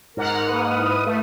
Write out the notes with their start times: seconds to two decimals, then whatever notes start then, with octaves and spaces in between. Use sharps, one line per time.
0.17 G#2 A#4 F#5 F6
0.49 A#3 B4 D#6
0.77 E4
1.06 A3